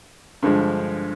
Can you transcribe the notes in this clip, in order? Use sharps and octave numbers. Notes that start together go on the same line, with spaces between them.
G2 D3 F3 G#3